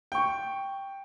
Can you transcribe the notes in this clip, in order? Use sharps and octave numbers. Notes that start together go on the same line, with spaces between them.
G5 C#6